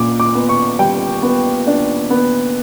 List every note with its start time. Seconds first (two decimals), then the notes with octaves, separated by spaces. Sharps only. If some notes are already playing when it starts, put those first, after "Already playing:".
Already playing: A#2 D6
0.20 D6
0.35 B3
0.49 C#6
0.79 G3 G5
1.22 B3
1.67 D4
2.10 B3